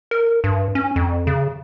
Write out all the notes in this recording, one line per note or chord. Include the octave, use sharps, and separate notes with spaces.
A#4
G2
C#4
F2
C#3